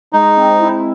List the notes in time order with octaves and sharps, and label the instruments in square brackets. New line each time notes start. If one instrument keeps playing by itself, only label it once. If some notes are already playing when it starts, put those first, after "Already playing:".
[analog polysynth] G#3 [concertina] D#4
[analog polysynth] C4
E4